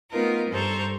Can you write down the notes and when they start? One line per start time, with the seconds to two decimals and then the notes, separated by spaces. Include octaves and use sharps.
0.10 A3 B3 D#4 F4 A#4
0.49 G2 G3 A4 C5 A#5 C#6